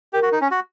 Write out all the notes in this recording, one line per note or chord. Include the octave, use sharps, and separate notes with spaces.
G4 A#4
F#4
D#4
C#4
F#4